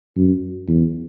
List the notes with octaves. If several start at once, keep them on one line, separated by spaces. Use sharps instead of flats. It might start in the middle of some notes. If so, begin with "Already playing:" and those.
F#2
E2